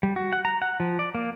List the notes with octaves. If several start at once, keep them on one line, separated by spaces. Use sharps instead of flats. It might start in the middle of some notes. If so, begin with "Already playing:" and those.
G3
F#4
F#5
A#5
F#5
F3
D5
A#3